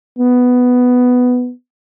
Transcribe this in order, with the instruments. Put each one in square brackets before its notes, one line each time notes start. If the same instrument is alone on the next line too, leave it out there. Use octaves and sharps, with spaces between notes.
[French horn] B3